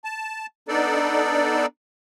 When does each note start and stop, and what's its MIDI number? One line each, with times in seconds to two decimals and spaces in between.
0.04 0.46 81
0.68 1.66 59
0.68 1.66 62
0.68 1.66 63
0.68 1.66 69
0.68 1.66 74